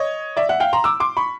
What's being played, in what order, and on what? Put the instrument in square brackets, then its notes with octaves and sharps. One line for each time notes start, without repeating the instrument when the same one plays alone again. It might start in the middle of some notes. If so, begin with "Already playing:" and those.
Already playing: [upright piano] C#5 D#5
D5 E5
E5 F#5
F5 G5
A#5 C6
D6 E6
C6 D6
B5 C#6